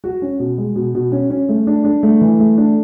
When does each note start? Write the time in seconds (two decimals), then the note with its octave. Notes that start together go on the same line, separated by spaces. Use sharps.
0.04 F#4
0.22 C#4
0.39 B2
0.58 G#3
0.76 B2
0.95 B2
1.12 C#4
1.30 C#4
1.49 A3
1.67 D4
1.84 D4
2.03 A3
2.21 E3
2.40 A3
2.58 D4